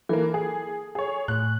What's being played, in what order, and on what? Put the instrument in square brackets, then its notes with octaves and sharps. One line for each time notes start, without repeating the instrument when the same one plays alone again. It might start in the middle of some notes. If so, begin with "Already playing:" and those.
[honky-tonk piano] E3 A#3 [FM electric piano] A4
[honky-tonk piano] G#4
G#4 C#5
[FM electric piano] A2 [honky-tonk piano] F#6